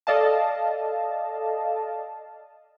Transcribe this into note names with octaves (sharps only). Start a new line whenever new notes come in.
A4 D5 D#5 F5 A5